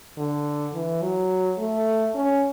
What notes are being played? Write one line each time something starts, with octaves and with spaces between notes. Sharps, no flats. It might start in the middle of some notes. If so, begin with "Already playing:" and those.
D3
E3
F#3
A3
C#4